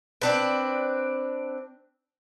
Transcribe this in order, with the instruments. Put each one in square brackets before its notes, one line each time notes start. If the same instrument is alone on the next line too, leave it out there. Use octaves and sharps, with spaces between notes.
[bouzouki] C4 D4 B4